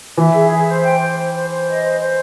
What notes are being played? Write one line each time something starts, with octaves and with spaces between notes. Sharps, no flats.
E3 E5
G#4
E5
C5
G5
C5
C5
C5
C5
D#5
C5
C5